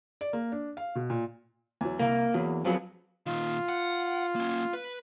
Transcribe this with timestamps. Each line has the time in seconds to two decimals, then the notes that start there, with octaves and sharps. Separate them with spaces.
0.21 D5
0.33 A#3
0.52 D4
0.77 F5
0.95 B2
1.10 A#2
1.81 E2 F#3
1.99 C2 A#3
2.34 E2 F#3 A#3
2.65 F2 F3 F#3 G#4 B4
3.26 A#2 D#3 F4
3.69 F#5
4.36 A#3 C#4
4.73 B4